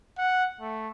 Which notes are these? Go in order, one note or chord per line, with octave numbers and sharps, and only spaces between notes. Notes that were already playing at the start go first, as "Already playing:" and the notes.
F#5
A3